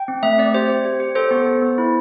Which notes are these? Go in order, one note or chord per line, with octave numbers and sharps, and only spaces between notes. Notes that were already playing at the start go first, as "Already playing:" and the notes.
Already playing: G5
C4
A3 E5
C4 D5
G4 C5
G4
G4
G4
A4 C5
B3
B3
B3
E4